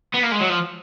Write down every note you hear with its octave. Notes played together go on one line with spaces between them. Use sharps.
B3
A#3
G#3
F#3
F3